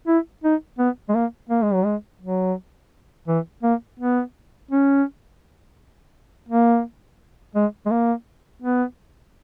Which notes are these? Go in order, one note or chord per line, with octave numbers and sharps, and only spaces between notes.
E4
D#4
B3
G#3
A#3
A#3
G#3
F#3
G#3
F#3
E3
A#3
B3
C#4
A#3
G#3
G#3
A#3
B3